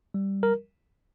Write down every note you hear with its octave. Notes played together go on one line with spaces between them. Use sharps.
G3
A#4